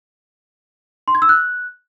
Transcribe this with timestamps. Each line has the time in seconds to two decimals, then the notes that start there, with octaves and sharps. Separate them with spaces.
1.08 C6
1.15 G#6
1.22 E6
1.29 F#6